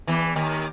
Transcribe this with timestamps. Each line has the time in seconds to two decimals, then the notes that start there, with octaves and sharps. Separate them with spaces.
0.07 E2 E3
0.36 D#2 D#3